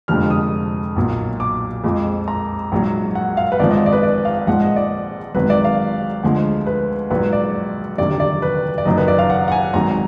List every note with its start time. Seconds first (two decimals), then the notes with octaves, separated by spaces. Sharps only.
0.08 F1 F2 D3 F3 G#3 F6
0.30 D#6
0.96 B1 A#2 F#3
1.40 D6
1.84 F2 F3 G#3
2.28 A#5
2.72 A#1 G#2 F#3
3.15 F#5
3.37 F5
3.52 B4
3.59 G#1 G#2 F3 D5
3.70 D#5
3.86 D5
3.93 B4
4.03 D5
4.25 F5
4.47 A#1 G#2 F3 G#3 F#5
4.62 D#5
4.76 D5
5.34 G#1 G#2 F#3 B4
5.50 D5
5.64 F5
6.23 D2 D3 F3 G#3
6.66 B4
7.11 A#1 G#2 F#3 B4
7.33 D5
7.98 F1 D#2 D3 F#3 D5
8.20 D5
8.42 B4
8.78 D5
8.85 F#1 F#2 D#3 F#3 D#5
8.98 B4
9.08 D5
9.19 F5
9.30 F#5
9.48 F#5
9.52 G#5
9.74 G#1 G#2 F#3 A#5